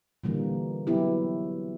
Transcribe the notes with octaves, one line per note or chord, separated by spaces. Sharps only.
A#2 D3 E3 G3 A#3
F#3 B3 E4 G4